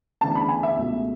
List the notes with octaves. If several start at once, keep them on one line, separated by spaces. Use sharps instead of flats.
D2 C#3 E3 B3 D4 A5
B5
G#5
E5
C#2 B2 F#3 A3